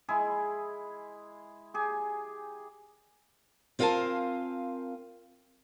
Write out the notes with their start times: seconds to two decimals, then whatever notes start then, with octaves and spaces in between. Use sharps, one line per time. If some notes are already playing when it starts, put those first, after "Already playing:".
0.08 G#3 E4 G#4
1.74 G4 G#4
3.79 C4 F4 A#4 F5 G#5 A5